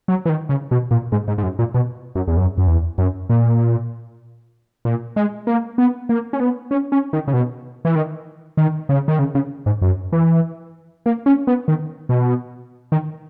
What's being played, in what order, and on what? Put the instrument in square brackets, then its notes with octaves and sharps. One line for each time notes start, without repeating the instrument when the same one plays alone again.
[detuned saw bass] F#3
E3
D#3
C#3
B2
A#2
G#2
G#2
G#2
F#2
A#2
B2
F#2
E2
F#2
F#2
E2
F#2
A#2
A#2
G#3
A#3
B3
A#3
C#4
B3
C#4
C#4
D#3
C#3
B2
E3
D#3
D#3
C#3
D#3
C#3
C#3
G#2
F#2
E3
A#3
C#4
B3
D#3
B2
D#3